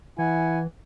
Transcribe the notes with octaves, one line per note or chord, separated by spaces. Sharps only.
E3 E4 F#5 G#5